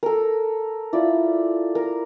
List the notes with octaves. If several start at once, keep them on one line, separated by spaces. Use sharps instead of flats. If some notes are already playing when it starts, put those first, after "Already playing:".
A4 A#4
E4 F4 D5
A#4